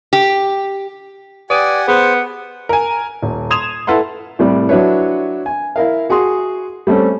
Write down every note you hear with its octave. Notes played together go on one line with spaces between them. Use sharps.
G4
G4 B4 D5 F#5 G#5 D#6 D#7
B3 G#4 C5 F#5
A#4 G#5
D#1
C6 D#6 G#6 E7 F7
E4 A4 B4 F#5 C6
C2 A2 G3 D5
F#3 D4 E4 B4 C#5
G#5
E4 A#4 F5
F#4 G#4 F#5 C6
G3 A3 C4 C#4 A4